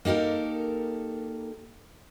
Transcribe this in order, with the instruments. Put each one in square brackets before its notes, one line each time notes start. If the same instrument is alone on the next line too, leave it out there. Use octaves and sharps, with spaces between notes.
[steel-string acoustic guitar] A#3 D#4 G4 A4 A#4